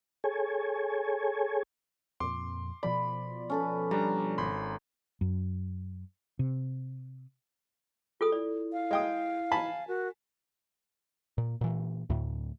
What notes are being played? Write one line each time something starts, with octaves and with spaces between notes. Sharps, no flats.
G#4 A4 C#5 G#5
F2 A#2 C6 D6
B2 F3 D5 B5
C#4 A4 B4
G3 D4 A#5
G#1 B5 C6
F#2
C3
F4 G#4 A4 D#6
E4 D5
F5
G#3 G5 D#6
G#5 A5 B5
F#4 A#4
A#2
A#2 E3
D2 A2